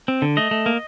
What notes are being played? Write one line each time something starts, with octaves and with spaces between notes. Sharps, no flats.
C4
D3
A3 D#5
A3
A#3